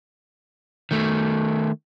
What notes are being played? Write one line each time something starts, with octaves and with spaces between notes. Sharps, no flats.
D#3 A3